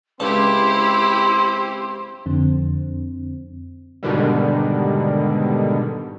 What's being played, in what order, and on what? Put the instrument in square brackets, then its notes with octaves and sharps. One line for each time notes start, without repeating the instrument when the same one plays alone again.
[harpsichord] C#2 A5 [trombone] C4 [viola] E4 G4 [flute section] C6
[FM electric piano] F2 D3 C4
[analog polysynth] G#2 B2 D3 D#3 G3